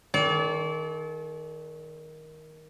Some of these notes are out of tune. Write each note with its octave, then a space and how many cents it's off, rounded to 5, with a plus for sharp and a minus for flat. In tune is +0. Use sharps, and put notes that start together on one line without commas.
D#3 +10 A4 -45 D5 -35